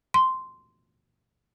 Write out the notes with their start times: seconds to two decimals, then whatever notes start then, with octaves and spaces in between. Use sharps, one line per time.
0.14 C6